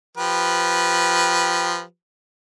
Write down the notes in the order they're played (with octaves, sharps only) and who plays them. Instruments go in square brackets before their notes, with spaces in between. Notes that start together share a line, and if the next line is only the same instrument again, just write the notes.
[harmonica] F3 G4 B4